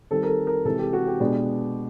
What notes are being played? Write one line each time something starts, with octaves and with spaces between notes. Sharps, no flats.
D#3 G3 C4 A4
A#4
A4
A#4
C3 E3 G#3 A4
G4
F#4
G4
B2 G#3 B3 D4